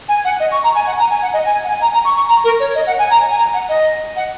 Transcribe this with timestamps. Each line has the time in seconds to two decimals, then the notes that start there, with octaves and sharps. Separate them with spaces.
0.09 G#5
0.25 F#5
0.40 D#5
0.52 C#6
0.63 A#5
0.75 G#5
0.87 F#5
0.99 A#5
1.11 G#5
1.22 F#5
1.33 D#5
1.46 G#5
1.64 F#5
1.69 G#5
1.81 A#5
1.93 A#5
2.05 C#6
2.16 C#6
2.28 A#5
2.44 A#4
2.60 C#5
2.75 D#5
2.87 F#5
2.99 G#5
3.10 A#5
3.30 G#5
3.38 A#5
3.54 F#5
3.69 D#5
4.16 F#5